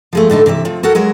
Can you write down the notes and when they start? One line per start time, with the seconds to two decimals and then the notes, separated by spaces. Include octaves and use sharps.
0.13 F3 G#3 A3
0.30 A2 D3 A3 D#4
0.46 C3 E3 D5 E5
0.65 F3 A3 C4
0.83 F#4 A4 A#4 F#5
0.95 D#2 F#3 G#3 A#4